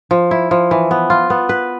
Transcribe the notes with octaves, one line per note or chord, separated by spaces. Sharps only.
F3
E4
F3
E3
B3
F4
B3
B4